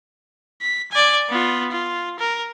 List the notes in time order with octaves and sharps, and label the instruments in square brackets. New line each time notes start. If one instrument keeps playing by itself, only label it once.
[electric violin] B6
D5 G#5
B3 F4
F4
A#4